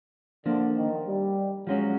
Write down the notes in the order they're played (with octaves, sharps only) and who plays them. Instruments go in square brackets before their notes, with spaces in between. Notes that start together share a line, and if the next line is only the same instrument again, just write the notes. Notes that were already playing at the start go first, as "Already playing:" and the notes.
[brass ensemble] D3 [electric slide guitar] F3 A#3 D4
[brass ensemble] D#3
G3
[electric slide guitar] F3 G#3 C#4 F#4 [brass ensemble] F#3